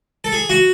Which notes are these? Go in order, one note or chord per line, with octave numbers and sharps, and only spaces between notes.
A4
G#4
F#4